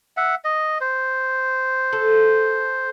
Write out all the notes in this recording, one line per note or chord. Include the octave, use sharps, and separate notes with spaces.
E5 F#5
D#5
C5
A4